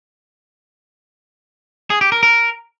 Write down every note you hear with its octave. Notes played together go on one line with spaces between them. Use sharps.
G#4
G4
A#4
A#4